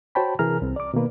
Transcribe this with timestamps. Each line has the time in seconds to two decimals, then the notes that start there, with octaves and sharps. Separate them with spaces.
0.15 F#4 C5 C#5 G5 A5 B5
0.39 C3 E3 G#4 A#4 A#5 F6
0.62 C2 C4
0.76 D5 D6
0.94 B2 D#3 A#3 B4